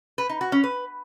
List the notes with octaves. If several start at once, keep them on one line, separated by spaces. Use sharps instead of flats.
B4
D#4
F#4
C#4
B4